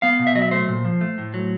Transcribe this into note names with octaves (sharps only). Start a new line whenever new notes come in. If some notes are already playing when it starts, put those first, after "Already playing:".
B3 F5
B2
E5
F#3 D#5
E5
A3 C5
A#2
F3
A3
A2
F#3